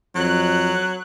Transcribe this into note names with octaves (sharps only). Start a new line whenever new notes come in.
F2 F#3 F#6